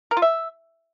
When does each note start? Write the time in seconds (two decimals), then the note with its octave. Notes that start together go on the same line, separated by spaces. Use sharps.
0.11 A#4
0.17 F4
0.22 E5